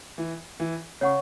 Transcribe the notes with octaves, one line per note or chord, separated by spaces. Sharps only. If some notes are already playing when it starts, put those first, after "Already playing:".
E3
E3
C#3 C#5 F#5 C#6